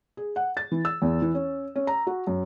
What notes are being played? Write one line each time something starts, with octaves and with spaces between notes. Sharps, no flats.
G#4
F#5
A6
E3
E6
E2
E3
C#4
C#4
A#5
F#4
F#2